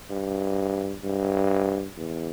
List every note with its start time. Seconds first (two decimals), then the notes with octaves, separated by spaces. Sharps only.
0.10 G2
1.04 G2
1.98 E2